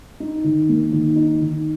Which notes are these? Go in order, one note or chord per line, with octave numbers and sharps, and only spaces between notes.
D#4
D#3
A#3
D#3
D#4
D#3